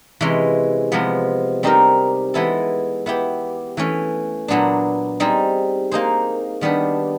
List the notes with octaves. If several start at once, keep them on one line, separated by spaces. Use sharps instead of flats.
C3 E3 G#3 C#4
C3 F3 G#3 B3
G3 C4 D#4 G4 A#4
E3 G#3 B3 E4 A4
B3 E4 G4
E3 A3 C#4
A#2 F#3 B3 D4
G3 C4 D#4 G#4
A#3 D#4 G#4 C5
D#3 G3 B3 D4